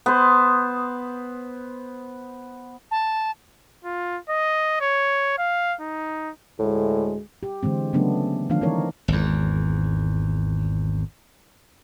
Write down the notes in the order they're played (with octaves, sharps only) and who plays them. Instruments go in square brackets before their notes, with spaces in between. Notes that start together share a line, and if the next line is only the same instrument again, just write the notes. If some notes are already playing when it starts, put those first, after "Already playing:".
[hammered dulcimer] B3 C5
[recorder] A5
[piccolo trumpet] F4
D#5
C#5
F5
D#4
[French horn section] D2 G#3 [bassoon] A2
[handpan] G4
D3 E3 G#3 C4
C#3 F#3 A3 B3 C#4 D4
D#3 F3 A3 D4 F5
E3 C4 D#4 A#4 C#5
[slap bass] G#1 E2